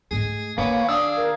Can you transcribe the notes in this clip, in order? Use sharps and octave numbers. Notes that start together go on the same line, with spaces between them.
G#2 A3 G#4
D#3 A#3 B3 C#5 F5 G#5
D4 G#4 F5 D#6 E6
A#4